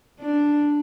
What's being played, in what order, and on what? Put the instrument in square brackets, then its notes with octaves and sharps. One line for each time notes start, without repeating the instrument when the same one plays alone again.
[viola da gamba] D4